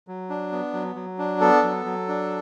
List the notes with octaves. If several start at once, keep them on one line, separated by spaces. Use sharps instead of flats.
F#3
D4
B3
F#3
F#3
D4
B3 A4
F#3
F#3
D4